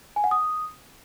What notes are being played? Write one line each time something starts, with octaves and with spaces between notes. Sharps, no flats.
G#5
F#5
D#6